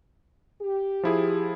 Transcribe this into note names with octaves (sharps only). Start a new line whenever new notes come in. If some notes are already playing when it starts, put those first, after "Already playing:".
G4
F3 E4 G#4